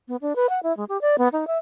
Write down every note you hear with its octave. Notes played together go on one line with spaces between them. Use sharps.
B3
D4
B4
F#5
E4
G#3
G4
D5
B3
D#4
E5